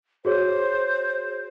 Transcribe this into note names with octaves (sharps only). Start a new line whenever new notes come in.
F#4 G#4 C5 C#5